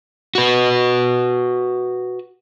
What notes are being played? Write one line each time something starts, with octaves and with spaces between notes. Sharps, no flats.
F#4 B4